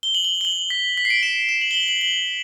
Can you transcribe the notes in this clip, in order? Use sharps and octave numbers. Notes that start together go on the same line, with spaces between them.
G7
F#7
G7
G7
F#7
B6
B6
C7
D7
E7
E7
F#7
G7
F#7
F#7
F#7